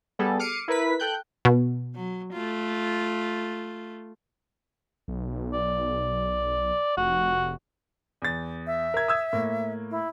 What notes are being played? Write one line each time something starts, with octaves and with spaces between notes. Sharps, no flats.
G3 B3 G#4 A4
D6 F6 C7 C#7 D#7
E4 A#4 B4 B6
A4 G5 F#6 G6
B2
F#3
A3 F4
B1
D5
F1 F#4
E2 A6
E5
A#4 G#6
D#6 E6 G#6
A2 A#3
E4